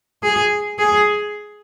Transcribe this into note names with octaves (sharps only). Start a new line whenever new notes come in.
G#4
G#4